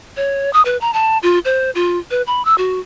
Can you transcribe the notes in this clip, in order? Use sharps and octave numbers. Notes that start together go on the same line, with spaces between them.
C#5
D#6
B4
A#5
A5
F4
C5
F4
B4
B5
E6
F#4